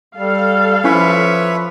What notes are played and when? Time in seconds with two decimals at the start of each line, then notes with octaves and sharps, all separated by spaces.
0.17 G3 A4 F5
0.84 F3 C#4 E4 B4 C#5 E5 C#6